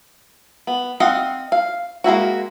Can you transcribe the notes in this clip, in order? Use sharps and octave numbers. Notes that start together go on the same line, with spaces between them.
B3
C4 D#5 F5 F#5
F5
G#3 A#3 E4 F#4